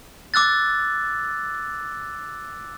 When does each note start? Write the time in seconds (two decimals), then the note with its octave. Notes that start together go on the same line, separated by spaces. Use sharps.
0.34 D6 E6 F#6 A6